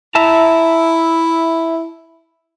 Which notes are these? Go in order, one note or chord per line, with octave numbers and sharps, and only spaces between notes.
E4 E5 A5 A#5